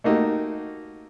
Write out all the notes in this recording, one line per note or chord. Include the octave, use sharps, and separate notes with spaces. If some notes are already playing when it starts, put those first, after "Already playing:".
A3 A#3 D#4 F#4 G4